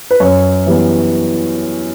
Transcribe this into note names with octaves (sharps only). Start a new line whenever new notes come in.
B4
F#2 C#5
E3 G3 B3